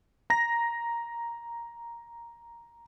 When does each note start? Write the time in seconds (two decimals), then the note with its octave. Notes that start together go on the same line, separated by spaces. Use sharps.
0.30 A#5 A#6